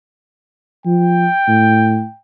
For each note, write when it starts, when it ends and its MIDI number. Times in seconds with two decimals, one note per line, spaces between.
0.86 1.27 53
0.86 2.19 79
1.48 2.04 45